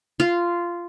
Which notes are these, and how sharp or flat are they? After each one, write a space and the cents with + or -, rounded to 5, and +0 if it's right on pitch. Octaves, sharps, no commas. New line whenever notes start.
F4 -10